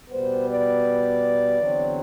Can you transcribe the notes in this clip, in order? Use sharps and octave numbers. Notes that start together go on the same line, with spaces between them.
B2 G3 B3 C5
D5
E2 D3 F#3 C4